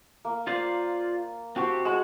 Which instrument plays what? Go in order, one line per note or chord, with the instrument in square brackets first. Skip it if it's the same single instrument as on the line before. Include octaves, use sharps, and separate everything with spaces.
[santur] A#3
[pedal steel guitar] F4 C5 D5
[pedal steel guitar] C4 G4 [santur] F#4 A5
[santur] G#3 [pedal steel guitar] F#4